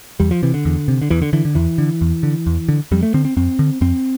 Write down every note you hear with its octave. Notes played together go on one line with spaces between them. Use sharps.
E2 G3
F3
C3 E3
D3
E2
C3
D3
E2 E3
D3
D3 E3
D3
E2 E3
D3
E2
D3
E2
D3
F2 G3
A3
D3 C4
C4
F2 C4
D3
F2 C4